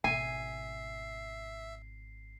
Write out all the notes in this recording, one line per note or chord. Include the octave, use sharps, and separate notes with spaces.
G#1 B2 E5 G#5 C7